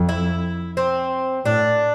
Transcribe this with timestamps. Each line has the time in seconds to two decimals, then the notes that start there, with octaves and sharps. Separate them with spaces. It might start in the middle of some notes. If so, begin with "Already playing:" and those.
Already playing: F2
0.09 E4
0.77 C4
1.45 A2 D4